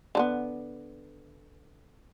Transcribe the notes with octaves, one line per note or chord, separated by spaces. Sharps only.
D3 A3 B3